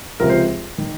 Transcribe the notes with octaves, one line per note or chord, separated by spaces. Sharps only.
C#2 C3 F3 A#4
C5
D#3